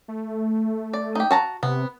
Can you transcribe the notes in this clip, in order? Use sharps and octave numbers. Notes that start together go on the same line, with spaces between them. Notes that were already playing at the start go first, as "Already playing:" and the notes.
A3
D5
D#4 G4
F#4 A5 A#5
C3 B3